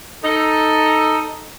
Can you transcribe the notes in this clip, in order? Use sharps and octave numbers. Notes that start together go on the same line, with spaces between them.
D#4 A4